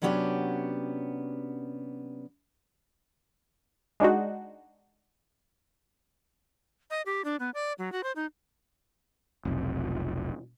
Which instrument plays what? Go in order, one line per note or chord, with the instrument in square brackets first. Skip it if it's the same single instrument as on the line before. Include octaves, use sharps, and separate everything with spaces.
[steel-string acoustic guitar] C3 F#3 B3 C#4 D4 G4
[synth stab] G#3 D4 D#4 F#4
[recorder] D#5
G4
D4
B3
D5
F#3
F#4
C5
D#4
[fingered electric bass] F1 B1